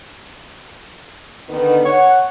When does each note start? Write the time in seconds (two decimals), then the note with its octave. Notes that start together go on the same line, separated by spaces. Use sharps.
1.49 D3 D#3 B3
1.86 C#5 F#5